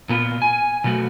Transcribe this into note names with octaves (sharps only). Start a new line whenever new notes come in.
A#2 B3 F4
G#5
B2 F#3 A3 F#4